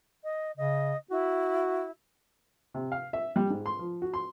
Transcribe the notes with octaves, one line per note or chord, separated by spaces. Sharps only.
D#5
C#3 D#5
E4 F#4
C3
F5
E5
G3
G#2
C6
F3
F#4
C6